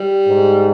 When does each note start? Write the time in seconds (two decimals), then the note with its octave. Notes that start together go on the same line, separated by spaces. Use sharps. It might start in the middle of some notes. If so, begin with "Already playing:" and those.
Already playing: G3
0.28 G#2